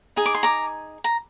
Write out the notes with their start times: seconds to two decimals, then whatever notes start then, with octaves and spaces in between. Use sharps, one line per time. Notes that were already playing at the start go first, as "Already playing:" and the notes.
0.16 D#4 G#4
0.26 D6
0.34 C6
0.43 A#5 D6
1.04 A#5